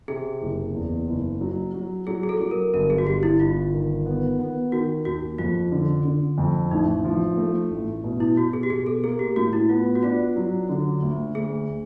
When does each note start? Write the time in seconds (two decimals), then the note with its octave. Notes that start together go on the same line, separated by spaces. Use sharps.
0.08 C3 G#4
0.41 F#1
0.75 E2
1.08 F#1
1.41 F#3
1.74 F#3
2.07 F#3 G#4
2.23 G#4
2.29 A4
2.40 F#3
2.51 A#4
2.74 G1 A#4
2.90 G#4
2.98 F#4
3.07 G1 G4
3.23 E4
3.40 G1 F4
3.73 D#3
4.06 B3
4.39 B3
4.72 D#3 F#4
5.05 D#2 F#4
5.38 F2 F4
5.72 D3
6.05 D3
6.38 F2
6.71 A1 D#4
7.04 F3
7.38 A3
7.71 A1
8.04 B2
8.20 E4
8.37 B2 F#4
8.53 G#4
8.63 G4
8.70 B2 G#4
8.87 A4
9.04 A#3 G#4
9.19 G4
9.36 A2 F#4
9.53 E4
9.69 B3 F4
9.95 F#4
10.03 D4 F4
10.36 F#3
10.69 D3
11.02 D2
11.35 D2 G#4